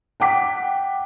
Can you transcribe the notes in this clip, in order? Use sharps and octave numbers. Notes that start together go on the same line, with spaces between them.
F#5 G5 D6 B6